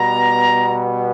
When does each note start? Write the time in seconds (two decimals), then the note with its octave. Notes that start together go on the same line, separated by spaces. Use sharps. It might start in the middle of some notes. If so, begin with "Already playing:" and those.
Already playing: B2 G3 B3 A#5